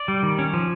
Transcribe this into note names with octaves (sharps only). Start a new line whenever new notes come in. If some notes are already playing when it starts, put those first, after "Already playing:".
Already playing: D5
G3
D#3
C#4
F3